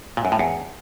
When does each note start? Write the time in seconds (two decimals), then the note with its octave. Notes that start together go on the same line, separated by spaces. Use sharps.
0.17 A#2
0.25 F#2
0.32 A2
0.39 E2